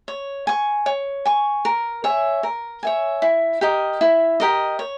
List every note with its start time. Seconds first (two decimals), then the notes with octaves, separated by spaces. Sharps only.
0.08 C#5
0.47 G#5 C#6
0.86 C#5
1.25 G#5 C#6
1.65 A#4
2.04 C#5 E5 G#5
2.43 A#4
2.83 C#5 E5 G#5
3.22 E4
3.61 G4 A#4 D#5
4.01 E4
4.40 G4 A#4 D#5
4.79 C#5